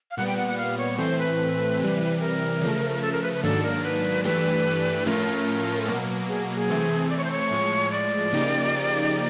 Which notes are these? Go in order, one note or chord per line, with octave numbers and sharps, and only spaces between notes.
F5
A#2 G3 B3 F#5
G5
F#5
F#5
F5
C#5
A2 E3 A3 C4 C5
B4
C3 E3 G3
A#4
C#3 F3 A3
A4
A#4
B4
B4
G#2 D#3 F#3 A#3 D4 A4
A#4
B4
G2 E3 A3 D4 G4 B4
A2 F3 A3 C#4 F4 A#4
B2 F#3 A#3
G#4
G#4
C3 E3 A3 C4
D5
C#5
C5
C#5
A2 F3 G#3
D5
C#3 F3 A#3 D#4 G4